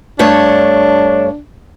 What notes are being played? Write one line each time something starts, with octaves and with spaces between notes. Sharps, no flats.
G2 A3 D4 C#5